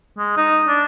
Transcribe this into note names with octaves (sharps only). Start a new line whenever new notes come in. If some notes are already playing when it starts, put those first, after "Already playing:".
G#3
D#4
D4